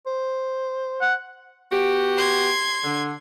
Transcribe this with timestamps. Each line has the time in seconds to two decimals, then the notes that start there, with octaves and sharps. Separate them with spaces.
0.07 C5
1.01 F#5
1.71 B3 F#4 G4
2.17 C6 G#6
2.84 D3